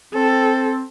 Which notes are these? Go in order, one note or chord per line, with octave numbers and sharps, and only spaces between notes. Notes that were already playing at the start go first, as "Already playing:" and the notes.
C4 A4